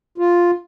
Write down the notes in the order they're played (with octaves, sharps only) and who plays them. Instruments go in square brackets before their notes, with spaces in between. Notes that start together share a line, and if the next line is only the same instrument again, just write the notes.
[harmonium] F4